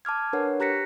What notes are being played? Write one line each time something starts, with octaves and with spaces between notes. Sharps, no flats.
A5 D6 F6 G#6
D4 A#4 B4 C#5 F#5
G4 A#5 F#6 A#6 B6 C#7